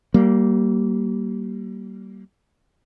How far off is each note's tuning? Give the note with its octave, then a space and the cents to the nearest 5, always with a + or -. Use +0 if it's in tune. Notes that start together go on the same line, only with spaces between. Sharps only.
G3 -30 A#3 +0